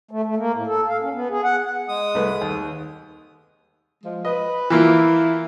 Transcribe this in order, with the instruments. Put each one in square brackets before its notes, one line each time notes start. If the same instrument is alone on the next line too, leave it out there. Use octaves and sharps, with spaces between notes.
[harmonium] A3
A3
A#3
A2
A4
F5
C#4
B3
G#4
F#5
[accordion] G#3 D#6
[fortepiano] C2 A3 B4
D#2
[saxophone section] F3 G#3
[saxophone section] B4 [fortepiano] D#5
[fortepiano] E3 A#3 F4 [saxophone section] E4